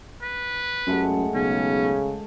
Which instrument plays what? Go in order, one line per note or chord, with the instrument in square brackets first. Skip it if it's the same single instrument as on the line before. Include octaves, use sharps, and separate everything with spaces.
[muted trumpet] B4
[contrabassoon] F#2 [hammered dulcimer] G#3 A3 F#5
[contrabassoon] B1 [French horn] C#3 [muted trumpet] C#4